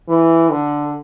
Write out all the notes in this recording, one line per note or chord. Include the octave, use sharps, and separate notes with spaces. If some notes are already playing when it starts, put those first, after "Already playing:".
E3
D3